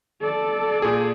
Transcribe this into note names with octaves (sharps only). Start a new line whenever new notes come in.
A4 D5
A#2 G#4